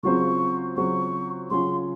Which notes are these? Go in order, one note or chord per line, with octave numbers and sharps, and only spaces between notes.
C#3 F#3 C4 F4 C5 C#6
C#3 F#3 C4 F4 C5 C#6
C#3 F#3 C#4 F4 G#4 C6